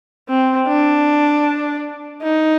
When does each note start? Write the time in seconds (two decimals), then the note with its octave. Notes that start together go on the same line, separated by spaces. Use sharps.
0.29 C4
0.68 D4
2.23 D#4